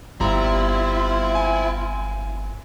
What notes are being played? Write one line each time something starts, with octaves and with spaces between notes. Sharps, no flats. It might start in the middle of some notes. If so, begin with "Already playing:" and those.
G1 G3 B3 C4 E4 F4 A#5
G#5